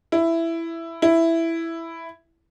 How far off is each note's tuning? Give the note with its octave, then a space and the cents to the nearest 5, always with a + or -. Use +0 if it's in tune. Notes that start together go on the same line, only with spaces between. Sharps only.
E4 +10
E4 +5